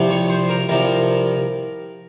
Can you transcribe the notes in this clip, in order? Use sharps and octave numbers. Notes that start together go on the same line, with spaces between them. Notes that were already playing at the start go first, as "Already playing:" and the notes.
Already playing: C2 C3 F3
C#5
C5
A#4
C2 C3 F3 A#4